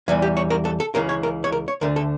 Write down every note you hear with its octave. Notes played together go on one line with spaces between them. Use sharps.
E2 E3 G3 E4
G4
C#5
A#4
A4
A4
C#2 C#3 E3 A#4
C#5
A#4
C#5
A#4
C#5
D2 D3 A3 A#4
A4